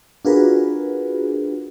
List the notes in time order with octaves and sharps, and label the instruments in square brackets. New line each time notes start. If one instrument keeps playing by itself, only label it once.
[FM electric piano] D4 F4 F#4 G#4 A#4 B4